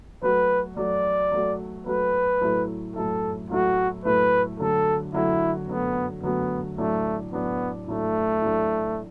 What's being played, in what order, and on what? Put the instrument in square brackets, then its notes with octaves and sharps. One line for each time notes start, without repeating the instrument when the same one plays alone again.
[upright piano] F#3 A3 F#4 [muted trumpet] B4
[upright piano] F#3 A3 F#4 [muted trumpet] D5
[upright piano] F#3 A3 F#4
[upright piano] F#3 A3 F#4 [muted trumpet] B4
[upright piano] A2 F#3 A3 E4
[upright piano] A2 F#3 A3 E4 [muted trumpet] A4
[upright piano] A2 F#3 A3 E4 [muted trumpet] F#4
[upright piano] A2 F#3 A3 E4 [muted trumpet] B4
[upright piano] D3 F#3 A3 F#4 [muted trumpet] A4
[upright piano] D3 F#3 A3 F#4 [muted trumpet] E4
[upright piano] D3 F#3 A3 F#4 [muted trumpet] B3
[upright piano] D3 F#3 A3 F#4 [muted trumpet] B3
[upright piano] A2 F#3 D4 [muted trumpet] A3
[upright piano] A2 F#3 D4 [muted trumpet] B3
[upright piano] A2 F#3 D4 [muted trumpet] A3
[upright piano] A2 F#3 D4